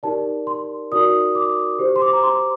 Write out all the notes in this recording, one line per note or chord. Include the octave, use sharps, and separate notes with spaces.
D#4 G4 A#4 D5 A5
C6
D#4 F#4 A#4 D5 D#6
D6
G4 C5
C6
D6
A#5
C6